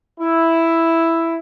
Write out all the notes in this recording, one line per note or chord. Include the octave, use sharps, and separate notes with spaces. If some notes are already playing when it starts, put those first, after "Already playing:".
E4